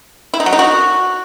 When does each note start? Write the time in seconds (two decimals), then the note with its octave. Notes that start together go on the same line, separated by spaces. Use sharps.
0.34 E4
0.40 D#4
0.46 F#3
0.53 D#4
0.59 F#4